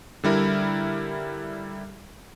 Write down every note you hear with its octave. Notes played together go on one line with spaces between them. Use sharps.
D3 G3 E4 A#4